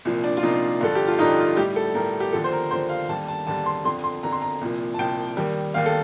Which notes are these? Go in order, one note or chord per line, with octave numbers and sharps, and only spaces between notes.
C2 A#2 F3
D4
F4
C2 A#2 F3 D#4
G2 D3 F3 A4
G4
F4
G2 D3 F3 D#4
F4
A2 G3 G4
A4
A2 G3 A#4
G4
D#2 D3 F3 A4
C5
A#4
D#2 D3 F3 C5
F5
D#2 D3 G3 A5
A5
D#2 D3 G3 A5
C6
F2 D3 F3 C6
C6
F2 D3 F3 A#5
C6
A#5
C2 A#2 F3
A5
C2 A#2 F3 G5
D#2 D#3 G3
D#2 D#3 G3 F5
A4